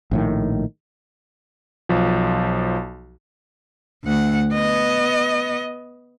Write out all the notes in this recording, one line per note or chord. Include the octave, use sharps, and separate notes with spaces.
A#1 A2 D#3
B1 F3
D2 F#5
B3 D#5